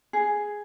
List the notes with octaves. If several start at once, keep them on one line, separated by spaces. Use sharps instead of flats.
G#4